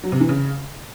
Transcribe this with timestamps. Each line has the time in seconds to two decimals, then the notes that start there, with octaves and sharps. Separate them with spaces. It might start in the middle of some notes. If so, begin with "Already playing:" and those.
0.04 F#3
0.12 C3
0.20 E3
0.29 C#3